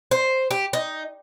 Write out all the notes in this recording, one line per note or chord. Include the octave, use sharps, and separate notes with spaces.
C5
G4
D#4